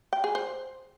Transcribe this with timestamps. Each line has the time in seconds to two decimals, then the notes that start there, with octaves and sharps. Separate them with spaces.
0.13 G5
0.24 G#4
0.35 C5